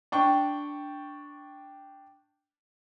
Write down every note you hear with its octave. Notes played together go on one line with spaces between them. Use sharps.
D4 G5 C#6